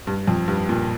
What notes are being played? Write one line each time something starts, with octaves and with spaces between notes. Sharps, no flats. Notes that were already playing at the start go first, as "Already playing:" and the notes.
G2
F2
G2
A#2